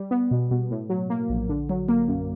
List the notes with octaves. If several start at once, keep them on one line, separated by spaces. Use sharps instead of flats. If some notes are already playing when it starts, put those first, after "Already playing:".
Already playing: G3
B3
B2
B2
A2
F#3
A#3
A#1
D3
F#3
A#3
F#2